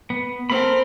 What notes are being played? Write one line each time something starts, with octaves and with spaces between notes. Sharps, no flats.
B3
C4 A4 A#4 B5